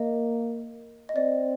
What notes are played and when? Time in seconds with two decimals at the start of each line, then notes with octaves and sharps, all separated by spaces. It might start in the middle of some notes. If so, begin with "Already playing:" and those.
Already playing: A#3 D#5
1.09 D#5
1.16 C4 D5